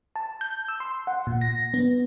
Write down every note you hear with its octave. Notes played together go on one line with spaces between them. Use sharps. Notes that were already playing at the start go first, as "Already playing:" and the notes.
A5
G6
E6
C6
F#5
A#2
A#6
B3